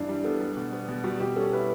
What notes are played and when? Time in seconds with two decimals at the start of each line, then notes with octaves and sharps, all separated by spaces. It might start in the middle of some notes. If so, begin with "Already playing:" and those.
Already playing: G2 E3 D4
0.09 G3
0.24 B3 A4
0.41 G3
0.57 B2
0.72 B3
0.89 B2
1.04 G3 F#4
1.20 B2 G4
1.36 C#4 A4
1.52 E4 B4